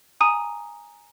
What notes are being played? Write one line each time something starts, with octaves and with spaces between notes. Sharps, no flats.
G#5 A#5 D#6 D#7